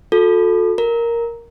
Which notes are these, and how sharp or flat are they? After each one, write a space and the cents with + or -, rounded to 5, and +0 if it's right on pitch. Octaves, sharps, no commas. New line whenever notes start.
F#4 -45 A4 +0
A#4 +0 A#5 +0